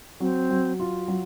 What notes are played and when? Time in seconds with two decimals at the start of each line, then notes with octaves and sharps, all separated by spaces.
0.20 F#3 C4
0.50 F#3
0.80 F4
1.08 F#3